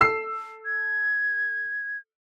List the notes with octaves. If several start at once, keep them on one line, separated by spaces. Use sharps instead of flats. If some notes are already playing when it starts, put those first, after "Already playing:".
A4 E6 C7
G#6